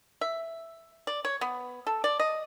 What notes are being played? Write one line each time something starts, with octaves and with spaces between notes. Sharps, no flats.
E5
D5
C#5
B3
A4
D5
D#5